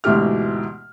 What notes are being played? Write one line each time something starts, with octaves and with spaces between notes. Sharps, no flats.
D2 G#2 B2 E3 G4 F6